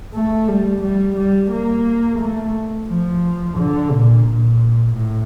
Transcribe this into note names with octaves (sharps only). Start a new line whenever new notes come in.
A3
G3
G3
G3
A#3
A3
F3
D3
A#2
A#2
A2